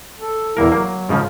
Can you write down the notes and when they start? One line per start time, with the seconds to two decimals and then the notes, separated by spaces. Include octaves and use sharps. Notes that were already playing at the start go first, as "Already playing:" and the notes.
0.19 A4
0.57 E2 A#3 E4 A#4
0.72 F#3 A#3
1.09 G#2 C#3 F3